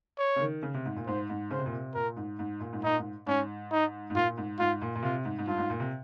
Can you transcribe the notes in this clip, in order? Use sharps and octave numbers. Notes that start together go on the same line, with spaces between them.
C#5
C#3
D#3
C#3
C3
G#2
A#2
G#2 C5
G#2
C#3 C5
C3
A#2
C3
A#2 A#4
G#2
G#2
A#2
G#2
A#2 D#4
G#2
G#2 C#4
D#4
G#2
A#2 F4
G#2
G#2 F4
A#2
A#2
C3 F4
G#2
G#2
G2 F4
G#2
A#2
C3